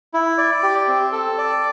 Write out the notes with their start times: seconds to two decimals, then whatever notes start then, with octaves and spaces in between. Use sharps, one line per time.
0.14 E4
0.38 D5
0.63 G4
0.88 C4
1.12 A4
1.38 D5